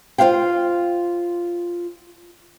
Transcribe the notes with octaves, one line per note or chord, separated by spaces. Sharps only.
F4 G4 C5 F5 G5